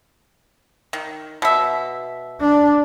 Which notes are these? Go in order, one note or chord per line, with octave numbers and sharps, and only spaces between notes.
D#3
B2 E5
D4